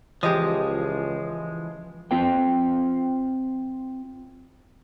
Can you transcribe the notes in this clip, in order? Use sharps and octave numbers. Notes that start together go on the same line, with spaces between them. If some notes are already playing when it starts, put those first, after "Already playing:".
C#2 E3 F3 G#3 G4 D#5
C4 F4 C5 G5